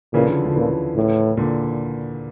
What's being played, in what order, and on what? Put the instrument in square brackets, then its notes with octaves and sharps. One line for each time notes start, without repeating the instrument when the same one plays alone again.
[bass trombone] A#2 [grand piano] C#3 E3
[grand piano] D3 F3
D3 F3
[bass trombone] A#2 [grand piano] C#3 E3
[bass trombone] A2
[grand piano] A#2 D3